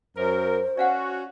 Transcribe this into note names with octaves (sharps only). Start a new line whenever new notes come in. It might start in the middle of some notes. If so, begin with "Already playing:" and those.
F#2 A#4 C5
C#4 F#4 D5 F5 F#5